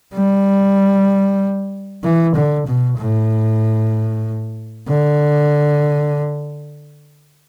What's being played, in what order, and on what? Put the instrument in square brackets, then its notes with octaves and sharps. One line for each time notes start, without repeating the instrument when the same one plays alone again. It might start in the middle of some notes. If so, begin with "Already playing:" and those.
[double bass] G3
E3
D3
B2
A2
D3